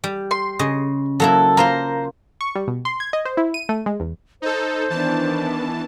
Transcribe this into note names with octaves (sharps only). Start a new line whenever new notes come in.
G3
C6
C#3 D#5
F#3 A#3 E4 A4
A#3 F4 C5 A#5
C#6
G3
B2
C6
G#6
D#5
C5
E4
D#7
A3
G#3
E2
D#4 A4 C5
D#3 E3 B3 D4 A5